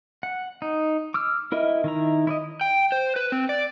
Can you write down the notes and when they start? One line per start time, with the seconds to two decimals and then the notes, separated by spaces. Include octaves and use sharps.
0.23 F#5
0.62 D#4
1.14 D6 E6 F6
1.52 E4 A#4 D#5 E5
1.84 D#3 E4 A#5
2.27 E4 D5 D#5
2.61 G5
2.92 C5
3.16 B4
3.32 C4
3.49 D5